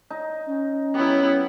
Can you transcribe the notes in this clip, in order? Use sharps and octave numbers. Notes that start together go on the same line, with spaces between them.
D#4
C#4
F#3 B3 E4 G4